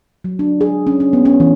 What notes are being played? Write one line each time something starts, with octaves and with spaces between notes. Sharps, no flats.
F#3
D4
G#4
C#4
C#4
B3
C#4
E3